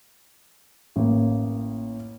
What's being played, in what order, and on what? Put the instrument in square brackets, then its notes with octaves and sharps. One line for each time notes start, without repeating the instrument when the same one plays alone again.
[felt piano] A1 A#3